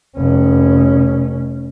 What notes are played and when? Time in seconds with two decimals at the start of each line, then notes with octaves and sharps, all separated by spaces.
0.17 F1 C#4